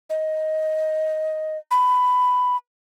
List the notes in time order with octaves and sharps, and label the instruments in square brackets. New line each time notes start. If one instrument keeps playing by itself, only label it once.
[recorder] D#5
B5